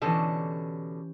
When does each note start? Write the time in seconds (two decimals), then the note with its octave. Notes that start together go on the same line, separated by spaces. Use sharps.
0.02 B2 D3 E3 C#4 G4 A4